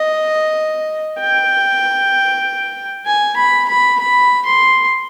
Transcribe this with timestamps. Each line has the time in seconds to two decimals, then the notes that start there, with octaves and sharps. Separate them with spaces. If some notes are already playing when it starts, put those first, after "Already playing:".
Already playing: D#5
1.20 G5
3.06 G#5
3.36 B5
3.68 B5
3.99 B5
4.45 C6